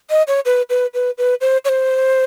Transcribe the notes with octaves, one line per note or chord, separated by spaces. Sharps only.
D#5
C#5
B4
B4
B4
B4
C5
C#5
C5